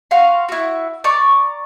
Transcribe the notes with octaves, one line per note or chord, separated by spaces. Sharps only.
F#4 F5 C6
E4 F#4
D5 A#5 C#6